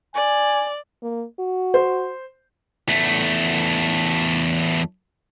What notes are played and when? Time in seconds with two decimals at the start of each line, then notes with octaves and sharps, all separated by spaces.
0.15 D5 G#5
1.03 A#3
1.39 F#4
1.74 C5
2.89 E2 A3